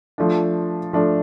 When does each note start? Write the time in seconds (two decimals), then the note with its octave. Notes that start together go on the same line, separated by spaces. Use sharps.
0.18 F3 A3 D4
0.93 F3 A3 D4